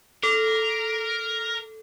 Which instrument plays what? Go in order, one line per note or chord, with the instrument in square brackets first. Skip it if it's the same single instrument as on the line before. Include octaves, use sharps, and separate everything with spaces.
[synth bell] A4 [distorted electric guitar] A#4